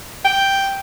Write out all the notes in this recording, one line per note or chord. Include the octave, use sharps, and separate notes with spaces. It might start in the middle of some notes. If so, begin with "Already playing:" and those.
G5